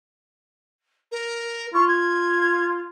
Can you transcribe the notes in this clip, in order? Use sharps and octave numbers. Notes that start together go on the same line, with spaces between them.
A#4
F4 C#6
G#6